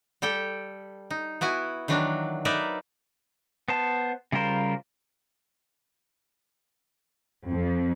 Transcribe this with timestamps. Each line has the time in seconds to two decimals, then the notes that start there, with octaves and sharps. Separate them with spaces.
0.22 G3 G4 A4 G5
1.10 D#4
1.41 B3 E4 F#4 G#5
1.88 D#3 E3 F#3 D4 F#4
2.45 D#4 A#4 B4 D5 E5
3.68 B3 C5 A5
4.32 C#3 G3 F4 A#4 C5
7.50 F2